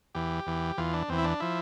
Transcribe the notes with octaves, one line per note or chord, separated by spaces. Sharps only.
E2 E3 G4
E2 E3
E2 E3 F4
D4
E2 E3 C4
E4
D4
F3 E4